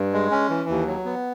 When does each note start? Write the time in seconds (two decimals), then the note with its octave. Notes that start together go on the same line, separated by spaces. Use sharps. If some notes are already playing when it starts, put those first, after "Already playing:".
Already playing: G2
0.13 G#3
0.31 C#4
0.50 E3
0.69 D#2
0.87 F#3
1.05 B3